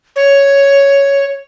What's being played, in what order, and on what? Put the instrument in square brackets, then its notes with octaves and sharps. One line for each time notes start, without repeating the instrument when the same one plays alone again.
[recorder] C#5